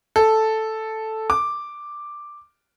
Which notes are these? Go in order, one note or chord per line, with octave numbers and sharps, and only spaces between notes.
A4
D6